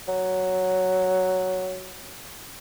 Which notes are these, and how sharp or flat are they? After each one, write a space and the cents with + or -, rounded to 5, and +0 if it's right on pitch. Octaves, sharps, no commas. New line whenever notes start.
F#3 +5